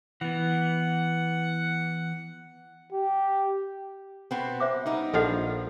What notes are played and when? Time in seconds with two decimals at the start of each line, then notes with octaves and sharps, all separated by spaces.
0.21 E3 B3 F#5
2.93 G4
4.31 B2 B3 C4
4.60 C5 E5 D6
4.86 G3 B3 D#4
5.14 A#1 F3 A4 D#5 F5 F#5